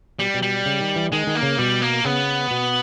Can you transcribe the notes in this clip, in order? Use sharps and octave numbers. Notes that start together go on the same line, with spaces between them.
B2 G3
B2
G3
C#3
D#3
E3
D#3 G#3
D#3
A#3
C#3
B2 G3
A#3
C#3 B3
B2